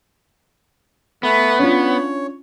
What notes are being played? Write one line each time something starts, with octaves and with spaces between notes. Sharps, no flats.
A3 B3 B4
C#4 D4 F4 C#5